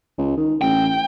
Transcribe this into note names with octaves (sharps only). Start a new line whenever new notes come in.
C#2
D#3
A1 G5